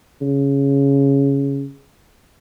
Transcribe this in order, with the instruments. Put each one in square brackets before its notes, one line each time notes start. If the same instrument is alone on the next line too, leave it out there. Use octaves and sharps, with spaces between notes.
[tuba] C#3